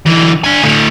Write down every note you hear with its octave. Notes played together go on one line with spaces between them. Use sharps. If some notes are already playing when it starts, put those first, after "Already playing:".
D3 E3
D4 G#5
A2 D3